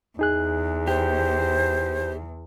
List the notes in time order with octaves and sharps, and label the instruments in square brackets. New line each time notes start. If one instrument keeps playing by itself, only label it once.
[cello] E2 [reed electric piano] D#4 G#4 F#6
[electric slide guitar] G4 [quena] C5